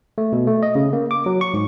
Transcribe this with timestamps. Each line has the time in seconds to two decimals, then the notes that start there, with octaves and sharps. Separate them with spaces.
0.18 A3
0.32 B2
0.47 A3
0.63 D#5
0.75 C#3
0.93 A#3
1.11 D6
1.26 F#3
1.41 C#6
1.54 G#2